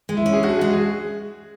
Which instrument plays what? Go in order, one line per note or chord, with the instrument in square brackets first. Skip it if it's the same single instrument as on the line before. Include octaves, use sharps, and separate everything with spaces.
[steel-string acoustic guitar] G#3
[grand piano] E4
[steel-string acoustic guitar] C#4
[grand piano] G#4
[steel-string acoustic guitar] D4 [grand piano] F#4
[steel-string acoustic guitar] G#3 [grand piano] F#4
[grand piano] G#4